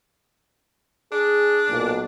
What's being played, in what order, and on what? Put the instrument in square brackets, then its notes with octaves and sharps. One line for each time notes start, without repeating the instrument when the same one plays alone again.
[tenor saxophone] D4 [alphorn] G#4
[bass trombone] B1 [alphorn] A#2